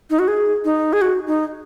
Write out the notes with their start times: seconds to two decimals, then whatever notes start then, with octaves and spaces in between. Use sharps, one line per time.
0.10 D#4
0.19 F#4
0.28 G#4
0.65 D#4
0.93 G#4
1.01 F#4
1.27 D#4